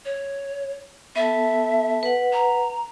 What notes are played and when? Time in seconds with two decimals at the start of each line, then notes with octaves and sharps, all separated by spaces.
0.05 C#5
1.16 B3 A4 E5 A5
2.03 B4 F#5
2.33 A#5